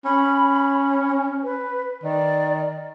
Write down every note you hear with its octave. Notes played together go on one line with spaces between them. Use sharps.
C#4 B5
B4
D#3 D5